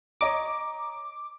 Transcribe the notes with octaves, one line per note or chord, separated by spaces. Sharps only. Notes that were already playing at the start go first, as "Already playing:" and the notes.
C#5 D#5 A#5 D6